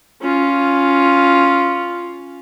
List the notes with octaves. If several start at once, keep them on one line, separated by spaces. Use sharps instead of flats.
C#4 F4